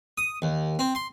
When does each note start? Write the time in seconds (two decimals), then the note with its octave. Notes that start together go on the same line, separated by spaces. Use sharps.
0.18 D#6
0.42 D#2
0.79 C4
0.95 C6